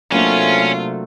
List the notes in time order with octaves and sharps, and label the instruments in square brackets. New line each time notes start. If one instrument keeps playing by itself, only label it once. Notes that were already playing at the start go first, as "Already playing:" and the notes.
[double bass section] C3 A3 [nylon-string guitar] F#3 A#3 D4 [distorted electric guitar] C#4 [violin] F4